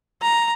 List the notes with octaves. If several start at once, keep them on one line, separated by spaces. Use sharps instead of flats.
A#5